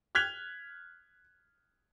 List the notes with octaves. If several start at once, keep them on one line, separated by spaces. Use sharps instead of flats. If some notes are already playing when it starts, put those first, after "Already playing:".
F6 F#6 G#6 B6 F7 G7